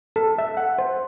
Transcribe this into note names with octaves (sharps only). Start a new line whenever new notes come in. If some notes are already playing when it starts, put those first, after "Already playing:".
A4
E5
F#5
C5